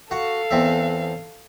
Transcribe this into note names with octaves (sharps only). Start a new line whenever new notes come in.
F#4 A4 F5
E2 C4 E5